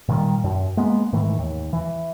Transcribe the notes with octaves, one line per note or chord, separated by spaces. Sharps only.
A#2 D#3 G3
F#2
G#3 A#3 B3
G#2 D#3 E3 A3
D#2
E3